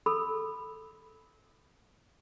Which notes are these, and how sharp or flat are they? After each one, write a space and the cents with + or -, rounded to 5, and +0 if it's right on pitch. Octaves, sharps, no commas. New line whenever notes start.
A4 +0 B5 +0 E6 -25